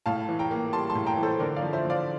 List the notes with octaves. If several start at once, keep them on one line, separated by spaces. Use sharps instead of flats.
A2 F5 A5
E3
G5 A#5
A#3
G3 A5 C6
A5 C6
A2
G5 A#5
E3
A4 C5
D3 A#4 D5
D5 F5
F3
C5 E5
D3
D5 F5